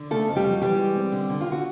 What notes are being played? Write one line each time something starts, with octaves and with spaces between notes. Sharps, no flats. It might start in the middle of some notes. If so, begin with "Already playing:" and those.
Already playing: D3
C#3 A3 A4
F2
G3 G4
F#3
E3 G3 G4
G#3
C4
D3
D3
F4
D3 F#4